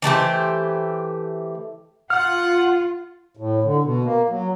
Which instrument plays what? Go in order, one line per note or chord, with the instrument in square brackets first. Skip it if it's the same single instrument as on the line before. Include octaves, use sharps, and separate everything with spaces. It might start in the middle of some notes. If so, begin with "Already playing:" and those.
[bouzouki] E3 A3 G4 C5
[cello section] F4 [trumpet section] F#5 [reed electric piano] F6
[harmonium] A2
D3
B2
A#3
F#3